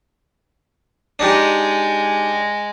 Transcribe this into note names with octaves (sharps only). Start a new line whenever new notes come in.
G#3 D4 D#4 G4